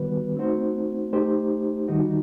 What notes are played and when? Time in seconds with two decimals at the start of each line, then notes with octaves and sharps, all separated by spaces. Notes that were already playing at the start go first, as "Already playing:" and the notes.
Already playing: D#3 G3 B3 F#4 B4
0.37 A3 C4 D#4 F#4 C5
1.13 A3 D#4 G4 C5
1.88 D#3 G3 D#4 F#4